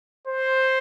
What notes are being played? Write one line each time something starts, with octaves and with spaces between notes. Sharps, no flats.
C5